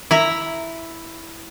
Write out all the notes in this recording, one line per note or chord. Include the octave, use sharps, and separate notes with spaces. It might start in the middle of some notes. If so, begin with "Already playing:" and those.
E4 E5 A#5